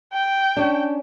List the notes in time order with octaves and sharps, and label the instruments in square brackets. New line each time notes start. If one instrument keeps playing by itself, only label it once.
[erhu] G5
[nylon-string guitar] C#4 D4